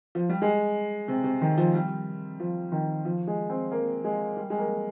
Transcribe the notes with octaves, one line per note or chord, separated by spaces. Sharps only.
F3
G3
G#3
C3
C3
D#3
F3
G3
F3
D#3
F3
G#3
C4
A#3
G#3
G3
G#3
A#3